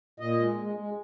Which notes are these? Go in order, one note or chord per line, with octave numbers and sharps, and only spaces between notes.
A#2 D#5
G#3
G#3
G#3